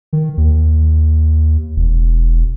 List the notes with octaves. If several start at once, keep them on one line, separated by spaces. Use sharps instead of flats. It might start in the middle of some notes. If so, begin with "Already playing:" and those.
D#3
D#2
E1